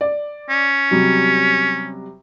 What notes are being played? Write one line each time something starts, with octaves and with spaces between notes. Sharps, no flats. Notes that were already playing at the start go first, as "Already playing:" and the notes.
D5
C#4
C3 F#3 G3